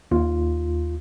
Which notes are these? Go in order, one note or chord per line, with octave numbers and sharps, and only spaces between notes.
D#2 F4